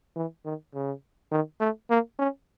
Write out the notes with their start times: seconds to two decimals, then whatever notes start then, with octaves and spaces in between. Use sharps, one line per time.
0.16 E3
0.45 D#3
0.74 C#3
1.31 D#3
1.60 A3
1.90 A#3
2.19 C#4